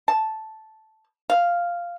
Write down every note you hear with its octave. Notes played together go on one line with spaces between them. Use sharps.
A5
F5